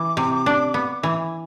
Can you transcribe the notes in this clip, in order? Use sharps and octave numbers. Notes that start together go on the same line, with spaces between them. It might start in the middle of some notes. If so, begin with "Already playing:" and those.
Already playing: E3 D6
C3
D4
B3
E3